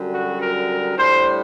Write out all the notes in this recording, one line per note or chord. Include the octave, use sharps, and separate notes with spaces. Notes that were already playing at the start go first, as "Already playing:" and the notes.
Already playing: F#2 D3 G3
F#4
A#4
A2 G3 D4 C5